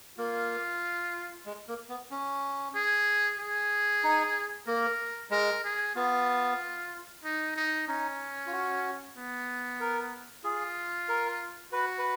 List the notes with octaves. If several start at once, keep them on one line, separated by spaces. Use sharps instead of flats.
A#3 F4
G#3
A#3
B3
C#4
G#4
G#4
D#4
A#3 A#4
G#3 A#4
G#4
B3 F4
D#4
D#4
C#4 D#4
F4
F#4
B3
A#4
F4 G#4
A#4
F#4 B4
B4